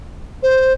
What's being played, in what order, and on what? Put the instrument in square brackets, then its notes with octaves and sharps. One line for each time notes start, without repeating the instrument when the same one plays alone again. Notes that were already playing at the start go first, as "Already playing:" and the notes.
[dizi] C5